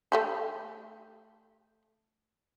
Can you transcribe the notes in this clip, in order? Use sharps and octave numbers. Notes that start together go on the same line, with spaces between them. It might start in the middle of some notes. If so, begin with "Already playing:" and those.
A3 G4 A4